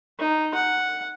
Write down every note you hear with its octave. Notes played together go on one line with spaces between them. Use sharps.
D#4
F#5